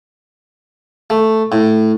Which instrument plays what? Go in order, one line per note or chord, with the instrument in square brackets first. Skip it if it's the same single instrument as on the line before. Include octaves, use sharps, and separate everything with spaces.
[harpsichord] A3
A2